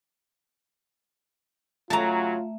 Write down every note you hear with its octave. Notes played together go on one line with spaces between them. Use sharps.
C#3 F#3 A3 F4 E5 A5 A#5